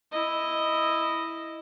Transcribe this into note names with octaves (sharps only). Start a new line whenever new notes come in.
E4 D#5